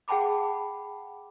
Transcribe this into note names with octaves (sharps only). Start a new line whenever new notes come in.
G#4 F#5 G5 A5 B5 D6